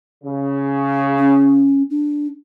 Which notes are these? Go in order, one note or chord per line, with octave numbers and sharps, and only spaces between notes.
C#3
C#4
D4